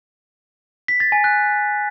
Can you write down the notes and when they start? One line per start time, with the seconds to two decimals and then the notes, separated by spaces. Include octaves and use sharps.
0.88 B6
1.00 A6
1.12 G#5
1.24 F#6